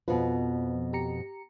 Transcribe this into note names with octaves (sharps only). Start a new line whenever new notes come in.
F2 B2 F3 F4 B4
G4 A#5 C#7